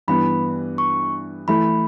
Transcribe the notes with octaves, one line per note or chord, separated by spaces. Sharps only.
G2 E3 B3 B5
C#6
E3 A3 E4 B5